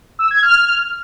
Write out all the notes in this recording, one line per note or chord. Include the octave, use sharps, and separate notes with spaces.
E6
G#6
F6